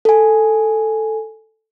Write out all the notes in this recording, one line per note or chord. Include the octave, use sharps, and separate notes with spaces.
A4 G#5